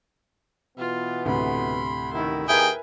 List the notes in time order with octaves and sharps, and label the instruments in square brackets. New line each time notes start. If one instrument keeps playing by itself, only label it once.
[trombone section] B2 E3 B3 [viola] F4
[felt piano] D2 A2 C3 [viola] B5 C6
[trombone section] A1 D#3 [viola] E4
[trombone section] D#2 D#4 [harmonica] G#4 G5 [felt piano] A#4 B4 E5 [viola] G#5